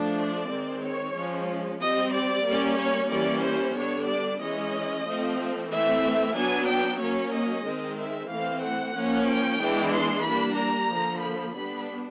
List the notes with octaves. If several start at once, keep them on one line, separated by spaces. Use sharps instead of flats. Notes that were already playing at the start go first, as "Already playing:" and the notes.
Already playing: F3 A3 D4
D5
D#3 G#3 C4
C#5
F3 G#3 C#4
G3 C4 D#5
D5
G3 A#3 C#4
C#5
E3 G3 A#3 C#4 D5
C5
D3 G3 B3 D4 C#5
D5
E3 G#3 C#4 D#5
F3 A3 C4
E3 A3 C4 E5
F#3 B3 D4 G#5
G5
F#3 A#3 C#4 C#5
D#5
D#3 G#3 C4
E5
E3 A3 C4 F5
F#5
F3 A#3 C#4
G5
E3 G#3 B3 D4
C6
G3 A#3 D4 B5
A#5
D3 F3 A#3
B5
G3 B3 D4 B5